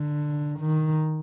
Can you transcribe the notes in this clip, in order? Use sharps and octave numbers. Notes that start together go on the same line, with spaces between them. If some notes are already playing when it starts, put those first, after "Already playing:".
Already playing: D3
D#3